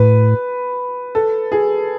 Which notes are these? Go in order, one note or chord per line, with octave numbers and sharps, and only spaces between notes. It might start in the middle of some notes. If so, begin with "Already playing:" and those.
Already playing: A2 B4
A4
G#4